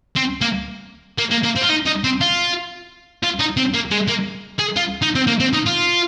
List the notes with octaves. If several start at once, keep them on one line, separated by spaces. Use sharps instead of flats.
C4
A#3
A#3
A#3
A#3
C4
F4
D#4
D#4
C4
F4
F4
D#4
C4
A#3
G#3
A#3
G#4
F4
D#4
C4
A#3
C4
D#4
F4